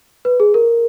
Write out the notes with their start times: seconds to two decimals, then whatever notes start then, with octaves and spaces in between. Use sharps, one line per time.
0.25 B4
0.40 G#4
0.54 A#4